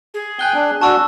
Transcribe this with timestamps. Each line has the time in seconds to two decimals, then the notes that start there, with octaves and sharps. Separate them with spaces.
0.14 G#4
0.39 G5 G#5 F#6 G7
0.54 D4
0.81 D4 F#4 A5 C#6 E6